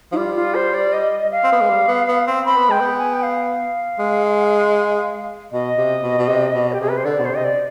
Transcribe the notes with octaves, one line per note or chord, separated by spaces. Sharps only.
F3 D#4
G3 F4
F4
C5
D5
D#5
F5
C4
B3
G#3
G3
B3
B3
C4
C4 B5
B3
G#3 G5
B3
G#5
G5
F5
G#3
B2 D#5
C3
B2
B2
C3
B2
G4
C3 G#4
B4
C5
D3 D5
B2
C5
C3 D#5
D5